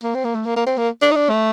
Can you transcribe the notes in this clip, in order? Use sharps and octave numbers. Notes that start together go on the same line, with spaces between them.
A#3
C4
A#3
A3
A#3
A#3
C4
A#3
D4
D#4
D4
A3